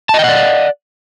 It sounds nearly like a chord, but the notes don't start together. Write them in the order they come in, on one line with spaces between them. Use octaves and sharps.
A5 D#5 G5 F#5 D5